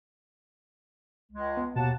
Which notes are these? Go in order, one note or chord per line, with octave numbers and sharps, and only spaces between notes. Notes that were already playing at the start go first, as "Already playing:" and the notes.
C#2 G#3
B3
D#2 B2 F#5 A5